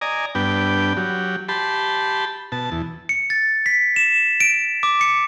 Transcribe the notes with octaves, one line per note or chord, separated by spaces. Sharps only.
D5 D#5 G#5 A#5
G2 B3 D4 G5
F#3 G4
G4 A5 B5 C6
B2 A5
E2
C#7
A6
B6
E7
D7
D6
C#7